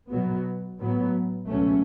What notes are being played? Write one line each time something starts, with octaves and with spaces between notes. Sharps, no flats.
B2 F#3 B3
A2 F#3 B3
C#2 B2 F#3 A3 C#4